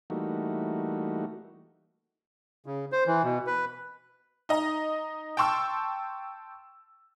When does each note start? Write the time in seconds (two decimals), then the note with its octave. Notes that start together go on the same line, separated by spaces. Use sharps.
0.10 E3 G3 A3 A#3 D#4 F#4
2.66 C#3
2.92 C5
3.07 E3
3.23 B2
3.47 B4
4.49 D#4 D#5 A#5
5.37 G5 A5 C6 C#6 E6